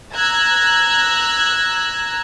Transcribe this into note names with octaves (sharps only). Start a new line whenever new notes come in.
A#5 E6 F#6 G#6